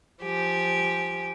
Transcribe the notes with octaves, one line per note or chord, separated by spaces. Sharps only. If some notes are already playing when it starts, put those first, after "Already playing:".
F3 G4 G#5